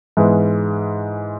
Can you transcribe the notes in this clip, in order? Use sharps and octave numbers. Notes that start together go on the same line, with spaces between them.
G#2 E3 G#3 B3